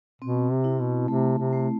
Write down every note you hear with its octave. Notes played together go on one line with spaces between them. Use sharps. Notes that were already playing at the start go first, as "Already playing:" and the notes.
B2 C4
C3
E4
B2
C3 A3
C3
A3